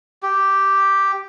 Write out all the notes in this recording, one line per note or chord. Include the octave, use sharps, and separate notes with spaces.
G4